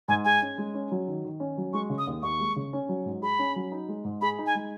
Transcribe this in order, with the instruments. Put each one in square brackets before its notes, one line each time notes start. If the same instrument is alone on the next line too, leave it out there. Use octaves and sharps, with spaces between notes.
[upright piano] G#2 [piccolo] G#5
[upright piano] G#4 [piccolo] G#5
[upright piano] C#4
G#3
C#4
F#3
D#3
D#3
C#4
F#3
[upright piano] G#3 [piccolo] C#6
[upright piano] C#3
[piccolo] D#6
[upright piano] D#2
[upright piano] D#2 [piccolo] C#6
[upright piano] G#3
C#3
C#4
F#3
G#2
[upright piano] G#4 [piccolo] B5
[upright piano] C#4
F#3
D#4
G#3
G#2
[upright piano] G#4 [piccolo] B5
[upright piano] D#4
[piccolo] G#5
[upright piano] G#3